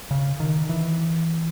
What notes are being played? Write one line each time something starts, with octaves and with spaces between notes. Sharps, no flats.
C#3
D#3
E3